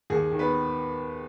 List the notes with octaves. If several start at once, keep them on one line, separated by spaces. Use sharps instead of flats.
D#2 G#4
D#3
B3 B4